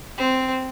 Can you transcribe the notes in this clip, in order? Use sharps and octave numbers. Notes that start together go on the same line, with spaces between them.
C4